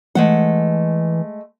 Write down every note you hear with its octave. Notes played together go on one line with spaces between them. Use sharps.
E3 G#3 A3 F#5